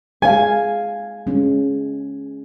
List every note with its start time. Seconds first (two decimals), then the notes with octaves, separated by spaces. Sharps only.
0.22 G#3 F5 G#5
1.27 G#3 C#4